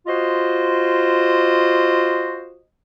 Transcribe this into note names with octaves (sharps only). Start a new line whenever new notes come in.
F4 F#4 C5 D#5